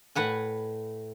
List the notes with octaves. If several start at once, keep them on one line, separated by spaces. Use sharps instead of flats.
A2 B4 F#5 G#5